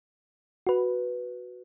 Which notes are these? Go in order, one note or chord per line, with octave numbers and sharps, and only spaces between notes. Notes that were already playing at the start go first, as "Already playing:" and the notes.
F#4 B4